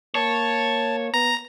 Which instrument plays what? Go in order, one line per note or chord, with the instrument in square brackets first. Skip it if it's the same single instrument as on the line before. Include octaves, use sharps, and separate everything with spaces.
[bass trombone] A#3 [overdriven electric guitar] C#5 [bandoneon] A5
[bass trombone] B3 [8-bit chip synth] A#5